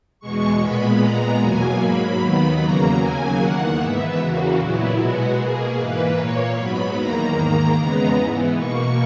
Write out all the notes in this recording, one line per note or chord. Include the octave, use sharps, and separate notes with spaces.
E2 B2 G#3 C#6
A#2 G#3 B3 B5
A#2 G#3 B3 A#5
E2 B2 F#3 A#3 G#5
G#2 F#3 A#3 B5
D#2 D#3 F#3 B3
E2 C#3 F#3 A#3 A#5
D#2 C#3 F#3 A#3 G#5
E2 D#3 A#3 F#5
G#2 E3 B3 E5
E2 C#3 E3 A#3 F#4
A#2 F#3 B3 E4
B2 G#3 B3 F#4
B2 A#3 G#4
G#2 E3 A#3 B4
A#2 A#3 C#5
G#2 F#3 B3 B5
E2 D#3 A#3 A#5
G#2 D#3 A#3 A#5
E2 C#3 G#3 B3 A#5
G#2 E3 B3
B2 A#3 C#6